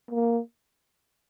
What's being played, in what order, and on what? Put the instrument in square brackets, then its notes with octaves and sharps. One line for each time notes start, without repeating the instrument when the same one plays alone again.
[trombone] A#3